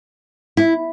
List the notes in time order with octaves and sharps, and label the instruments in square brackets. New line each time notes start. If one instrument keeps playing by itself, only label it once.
[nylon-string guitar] E4